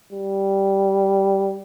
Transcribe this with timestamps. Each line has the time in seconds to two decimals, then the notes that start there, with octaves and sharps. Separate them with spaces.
0.13 G3